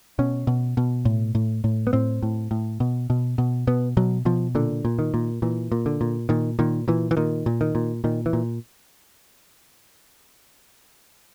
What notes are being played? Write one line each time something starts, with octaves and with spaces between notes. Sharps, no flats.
B2 C#4
B2
B2
A2
A2
A2
B3
A2 C4
A2
A2
B2
B2
B2
B2 B3
B2 F#3
B2 F3
A#2 D3
A#2
D#3
A#2
A#2 E3
A#2
D3
A#2
A#2 D#3
A#2 D#3
A#2 E3
E3
A#2 D#3
A#2
D#3
A#2
A#2 D#3
E3
A#2